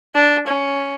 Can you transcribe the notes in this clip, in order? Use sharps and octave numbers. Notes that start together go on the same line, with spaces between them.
D4
C#4